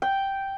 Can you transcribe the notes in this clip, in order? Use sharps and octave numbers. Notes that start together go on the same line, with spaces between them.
G5